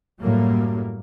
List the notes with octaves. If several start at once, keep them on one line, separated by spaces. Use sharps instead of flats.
F#2 A2 F#3 G3 A#3